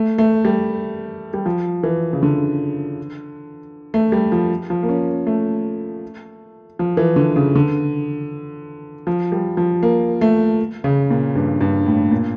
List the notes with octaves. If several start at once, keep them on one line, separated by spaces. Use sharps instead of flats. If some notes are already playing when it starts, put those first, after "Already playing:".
Already playing: A3
A3
G3
G3
F3
E3
C#3
D3
A3
G3
F3
F3
A#3
C#4
A3
F3
E3
D3
C#3
D3
F3
G3
F3
A#3
A3
C#3
A#2
G2
G2
A2
A#2